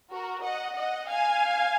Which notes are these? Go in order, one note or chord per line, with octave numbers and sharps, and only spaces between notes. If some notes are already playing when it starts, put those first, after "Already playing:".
F#4 A#4
D#5 F#5
D#5 F#5
F5 G#5